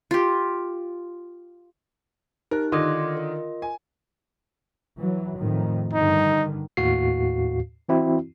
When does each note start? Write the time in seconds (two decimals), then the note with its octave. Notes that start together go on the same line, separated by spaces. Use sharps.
0.11 F4 G4
2.51 D#4 G4 A#4 F#6
2.72 D3 D#3 F4 D#5 C6 D6 D#6 G#6
3.17 A#4
3.62 G#5
4.98 E3 F#3
5.37 F2 A2 D#3
5.93 G2 D3 D#3 D#4
6.77 D#2 A2 F#4 F5 C7
7.89 E3 C4 E4 F#4